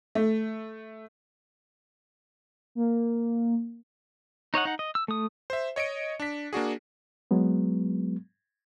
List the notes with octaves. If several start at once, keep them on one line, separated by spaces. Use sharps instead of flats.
A3
A#3
D#4 C#5 D#5 F#5
D#4 F#5
D#5
E6
A3 D#6
C5 E5
C#5 D#5 C#7 D7
D4 B6
A#3 D4 F#4 G#4
F#3 G#3 B3